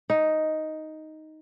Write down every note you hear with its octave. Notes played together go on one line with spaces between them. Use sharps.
D#4